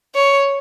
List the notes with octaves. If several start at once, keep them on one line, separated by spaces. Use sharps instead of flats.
C#5